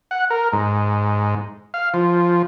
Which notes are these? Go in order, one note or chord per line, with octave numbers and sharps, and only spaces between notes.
F#5
A#4
G#2
F5
F3